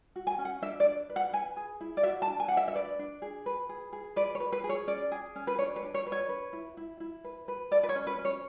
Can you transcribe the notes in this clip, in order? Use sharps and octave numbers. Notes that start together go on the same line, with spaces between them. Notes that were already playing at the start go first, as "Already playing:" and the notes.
F#4
G#5
C#4
F#5
D4 E5
D5
D4
B4
F#5
B4 G#5
G#4
E4
D5
F#4 E5
A5
D4
G#5
D4 F#5
E5
E5
B4 D5
D4
G#4
B4
G#4
G#4
B4 D5
C#5
B4
B4
G#4
C#5
C#4 D5
G#4
C#4
B4
D4 C#5
B4
D4
C#5
B4
C#5
B4
E4
E4
E4
B4
B4
A4 D5
B4
C#5
C#4
B4
C#4
C#5